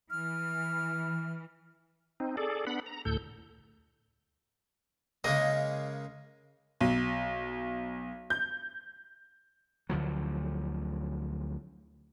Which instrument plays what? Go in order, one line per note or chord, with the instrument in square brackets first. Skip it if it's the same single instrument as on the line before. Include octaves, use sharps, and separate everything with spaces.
[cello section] E3 [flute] F6
[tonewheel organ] C4 D#4
G#4 A4 D5
B3 D4 F#5 B5
A#5
D2 A2 A4 G6
[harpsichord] C#3 G#3 A#3 [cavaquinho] D#5
[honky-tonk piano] B1
G6
[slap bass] D2 D3 F3 F#3